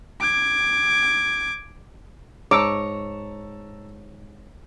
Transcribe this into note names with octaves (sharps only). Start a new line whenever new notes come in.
D6 G#6
G#2 C#5 A5 A#5 D6 E6